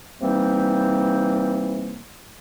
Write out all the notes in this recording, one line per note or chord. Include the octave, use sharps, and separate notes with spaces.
C3 E3 G3 A#3 C4 D#4